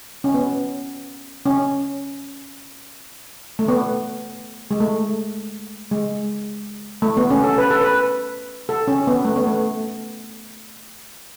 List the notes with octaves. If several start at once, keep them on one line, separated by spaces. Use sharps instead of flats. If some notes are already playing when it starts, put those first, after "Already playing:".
C#4
B3
C#4
A3
B3
G#3
A3
G#3
A3
B3
C#4
A4
B4
A4
B4
A4
C#4
B3
A3
B3
A3